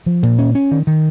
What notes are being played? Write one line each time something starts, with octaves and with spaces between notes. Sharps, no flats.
F3
A#2
C#4
C#4
D#3
D#3